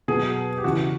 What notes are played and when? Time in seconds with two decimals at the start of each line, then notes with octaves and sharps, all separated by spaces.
0.08 B2 F#3 G#4
0.58 G4
0.64 C#3 E3 F#4